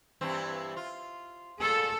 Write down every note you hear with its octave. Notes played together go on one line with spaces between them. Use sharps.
G2 E3 C4
F4
A#2 G#4 A4